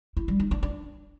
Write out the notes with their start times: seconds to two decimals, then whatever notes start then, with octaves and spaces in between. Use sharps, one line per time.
0.17 E4
0.28 G3
0.40 D#4
0.51 D4
0.63 D4